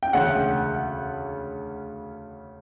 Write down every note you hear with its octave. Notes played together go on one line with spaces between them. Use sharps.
G5
E1 D2 C#3 F#5